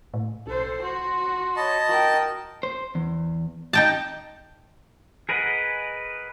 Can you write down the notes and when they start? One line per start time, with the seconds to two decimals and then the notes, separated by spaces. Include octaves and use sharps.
0.14 A2
0.47 B1 A4 C5
0.82 F#4 C6
1.56 C#5 D#5 A5 B5
1.88 F#4 A#4 G5
2.63 C5
2.95 E2
3.73 D#4 G5 A5
5.29 G#4 A#4 B4 D#5 F#5